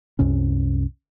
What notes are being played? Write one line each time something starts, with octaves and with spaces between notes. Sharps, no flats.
C2 F#2 C3 C#4